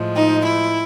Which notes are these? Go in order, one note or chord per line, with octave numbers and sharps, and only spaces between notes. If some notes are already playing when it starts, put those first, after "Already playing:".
Already playing: A2 F3 G#3
D#4
E4